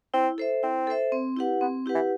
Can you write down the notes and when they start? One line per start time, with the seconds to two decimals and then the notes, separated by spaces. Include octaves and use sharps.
0.14 C4 E4
0.38 A4 C5 E5
0.63 C4 E4
0.87 A4 C5 E5
1.12 C4
1.37 E4 G4 B4 F#5
1.61 B3 C4
1.86 E4 G4 B4 F#5
1.95 E3